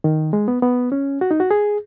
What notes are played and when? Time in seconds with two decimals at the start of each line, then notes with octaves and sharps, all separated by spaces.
0.04 D#3
0.33 G#3
0.48 B3
0.62 B3
0.92 C#4
1.21 F#4
1.31 D#4
1.40 F#4
1.51 G#4